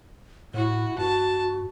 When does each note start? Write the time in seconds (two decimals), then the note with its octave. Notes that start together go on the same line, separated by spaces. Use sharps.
0.54 A2 E4 F#4
0.98 G2 F#4 A5